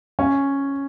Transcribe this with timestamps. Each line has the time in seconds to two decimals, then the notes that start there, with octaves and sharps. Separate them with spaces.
0.19 C#4